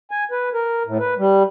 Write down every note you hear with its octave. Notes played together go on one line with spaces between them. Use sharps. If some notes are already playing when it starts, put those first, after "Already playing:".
G#5
B4
A#4
A2
B4
G3